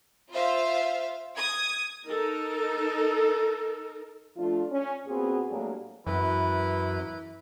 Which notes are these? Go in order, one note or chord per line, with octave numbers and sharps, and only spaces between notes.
F4 C5 E5 F5
D#6 G#6
D#4 A4 A#4
F3 A3 D4 F4
C#4
A#2 B3 C4 F#4 G#4
A2 F#3 G3 A#3 D4 G#4
F#2 E3 B4